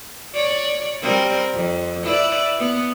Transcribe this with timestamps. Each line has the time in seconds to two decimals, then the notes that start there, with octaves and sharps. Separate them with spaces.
0.34 C#5 D5
1.02 G3 C4 A#4
1.52 F2
2.04 E4 B4 D5
2.59 B3